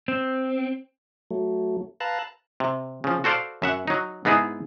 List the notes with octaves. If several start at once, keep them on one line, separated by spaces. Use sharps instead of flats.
C4
F#3 A3
B4 F5 A5 A#5 E6 F#6
C3
C#3 F3
F#4 A4 C5 D5 F5
F#2 E5 F#5
F#3 D#4
G#2 B3 D#4 E4 G#4